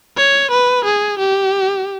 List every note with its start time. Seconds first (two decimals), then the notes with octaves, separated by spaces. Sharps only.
0.17 C#5
0.51 B4
0.85 G#4
1.19 G4